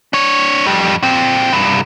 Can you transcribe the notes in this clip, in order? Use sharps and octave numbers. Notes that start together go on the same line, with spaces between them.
D4 C#5
F2 G3
A#2 C4
C2 G2